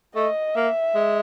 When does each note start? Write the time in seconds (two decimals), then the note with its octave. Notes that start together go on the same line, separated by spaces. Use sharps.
0.16 A3 D#5
0.55 A#3 E5
0.95 G#3